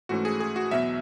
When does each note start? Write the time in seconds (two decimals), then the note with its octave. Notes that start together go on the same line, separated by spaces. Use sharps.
0.09 G#2 E3 A3 C#4 F#4
0.25 G#4
0.40 G#4
0.56 F#4
0.71 E2 B2 F#3 E5